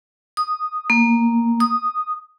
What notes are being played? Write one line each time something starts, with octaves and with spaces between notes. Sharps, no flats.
D#6
A#3
D#6